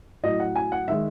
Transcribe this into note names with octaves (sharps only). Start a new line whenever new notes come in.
A2 F#3 D#5
F#5
G#5
F#5
D#3 G#3 E5